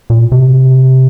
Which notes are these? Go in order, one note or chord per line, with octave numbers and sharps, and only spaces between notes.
A#2
C3